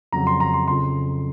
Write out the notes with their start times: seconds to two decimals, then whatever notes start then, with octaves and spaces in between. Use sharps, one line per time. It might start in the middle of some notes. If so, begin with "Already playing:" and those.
0.12 F2 C#3 F#3 A#5
0.27 C6
0.40 A#5
0.54 C6
0.68 F2 C#3 F3 C6